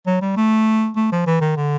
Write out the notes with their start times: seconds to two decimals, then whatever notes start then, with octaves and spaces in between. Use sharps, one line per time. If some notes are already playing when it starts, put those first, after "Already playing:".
0.07 F#3
0.22 G3
0.37 A3
0.96 A3
1.12 F3
1.26 E3
1.41 D#3
1.57 D3